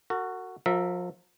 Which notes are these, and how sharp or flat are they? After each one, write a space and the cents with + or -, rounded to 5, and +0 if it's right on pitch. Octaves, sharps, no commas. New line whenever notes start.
F#4 +0 A#4 -45
F3 +35 A#4 +0 E5 +0